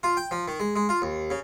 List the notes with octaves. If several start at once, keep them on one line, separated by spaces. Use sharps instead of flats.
F4
G5
F3
D#3
G#3
G#3
F4
D#2
C#3